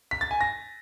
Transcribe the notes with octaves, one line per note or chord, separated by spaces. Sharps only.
B6
A6
G#5
A#6